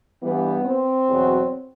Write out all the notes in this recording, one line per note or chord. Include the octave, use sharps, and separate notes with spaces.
G2 E3 G3 B3
C4
E2 B2 F#3